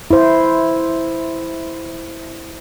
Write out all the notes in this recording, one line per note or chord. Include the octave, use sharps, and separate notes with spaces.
E4 C5